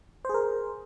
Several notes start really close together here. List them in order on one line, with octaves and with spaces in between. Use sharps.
C5 G#4 A#4